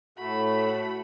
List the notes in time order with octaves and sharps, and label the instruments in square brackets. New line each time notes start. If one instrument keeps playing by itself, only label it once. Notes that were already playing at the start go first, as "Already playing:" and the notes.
[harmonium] A2 [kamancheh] A3 B5 [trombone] F#4